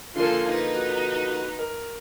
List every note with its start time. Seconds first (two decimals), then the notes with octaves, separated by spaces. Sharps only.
0.16 D3 F3 A#3 F4 A4 G#5 C6
0.46 D#4 B4
0.75 F#4
1.59 A#4